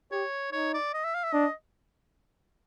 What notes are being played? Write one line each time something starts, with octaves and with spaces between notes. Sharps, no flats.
G4 C#5
D#4 C#5
D5
D#5
E5
F5
E5
D4 D#5